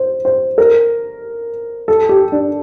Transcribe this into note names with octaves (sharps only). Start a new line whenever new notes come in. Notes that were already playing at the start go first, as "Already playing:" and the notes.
Already playing: C5
C5
A#4
A4
G4
D4